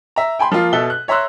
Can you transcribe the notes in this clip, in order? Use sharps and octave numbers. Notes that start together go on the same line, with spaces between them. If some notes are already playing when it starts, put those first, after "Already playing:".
E5 A#5
G5 G#5 B5 C6
F3 A#3 F4
B2 A4 E5 F#6 G7
F#6
C#5 E5 A#5 C6 E6 F#6